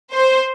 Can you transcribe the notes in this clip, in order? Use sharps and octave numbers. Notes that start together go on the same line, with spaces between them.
C5